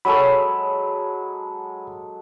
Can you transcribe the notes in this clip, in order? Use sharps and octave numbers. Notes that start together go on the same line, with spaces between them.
F#3 G#3 A4 B5